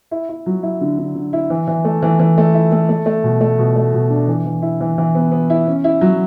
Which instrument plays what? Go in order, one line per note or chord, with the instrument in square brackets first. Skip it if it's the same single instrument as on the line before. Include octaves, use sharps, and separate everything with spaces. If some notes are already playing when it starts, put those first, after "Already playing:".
[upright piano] E4
E4
F#3
E4
D3
D3
D3
E4
E3
E3
A3
E3
E3
A3
E4
A3
A3
A3
B2
A3
B2
A3
B2
D4
E3
E3
E4
E3
E3
B3
B3
E4
C#4
E4
F#3